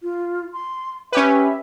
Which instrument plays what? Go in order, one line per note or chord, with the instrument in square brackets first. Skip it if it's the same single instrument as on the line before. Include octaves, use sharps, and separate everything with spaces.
[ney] F4
C6
[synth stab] C#4 G4 B4 [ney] E5